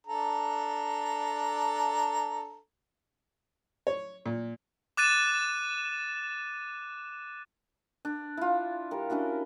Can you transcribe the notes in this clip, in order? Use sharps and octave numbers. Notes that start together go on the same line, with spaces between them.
D4 A4 A#5
C#5
A#2
D6 F#6 A6 D#7 E7
D4
E4 F4
G3 A#4
C#4 D4 E4 F#4